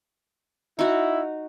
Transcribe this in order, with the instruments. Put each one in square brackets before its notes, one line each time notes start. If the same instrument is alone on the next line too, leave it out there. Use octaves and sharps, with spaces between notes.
[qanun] D#4 F#4 [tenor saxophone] E4